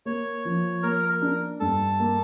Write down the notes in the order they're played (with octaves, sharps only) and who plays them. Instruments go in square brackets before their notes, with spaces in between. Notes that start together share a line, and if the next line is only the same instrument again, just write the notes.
[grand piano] A#3 [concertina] C#5
[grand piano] F3
[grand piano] A#3 [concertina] A#4
[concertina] A#4
[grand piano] D4
[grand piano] G2 [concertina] A4
[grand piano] A#3